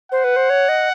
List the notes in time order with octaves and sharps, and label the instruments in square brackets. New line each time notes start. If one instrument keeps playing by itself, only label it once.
[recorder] C5 [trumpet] F#5
[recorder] B4
C5
C#5
D#5